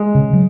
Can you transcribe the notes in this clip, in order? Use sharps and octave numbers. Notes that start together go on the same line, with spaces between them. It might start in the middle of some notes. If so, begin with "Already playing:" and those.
Already playing: G#3
C#3
F#3